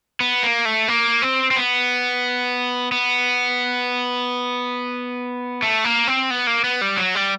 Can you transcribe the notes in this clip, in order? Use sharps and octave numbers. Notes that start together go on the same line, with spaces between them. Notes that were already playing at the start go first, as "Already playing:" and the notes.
B3
A#3
A3
A#3
C4
C4
B3
B3
A3
A#3
C4
B3
A#3
B3
G3
F#3
G3